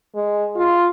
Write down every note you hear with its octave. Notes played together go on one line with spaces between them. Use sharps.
G#3
F4